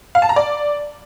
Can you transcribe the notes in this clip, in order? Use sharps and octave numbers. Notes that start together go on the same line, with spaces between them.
F5
A5
A#5
D5